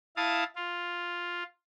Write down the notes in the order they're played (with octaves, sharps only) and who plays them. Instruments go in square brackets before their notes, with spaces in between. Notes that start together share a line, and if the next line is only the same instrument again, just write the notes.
[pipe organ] E4 F5 A5 D#6
F4